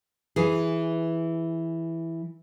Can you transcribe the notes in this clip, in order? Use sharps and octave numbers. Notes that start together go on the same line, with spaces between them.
E3 G#4